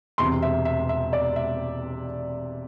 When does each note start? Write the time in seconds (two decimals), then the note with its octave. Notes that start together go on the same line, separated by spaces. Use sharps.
0.18 E1 E2 C3 C6
0.42 E5
0.65 E5
0.89 E5
1.13 D5
1.36 E5